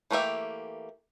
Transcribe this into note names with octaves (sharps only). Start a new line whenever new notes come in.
E3 A3 A#3 G4 E5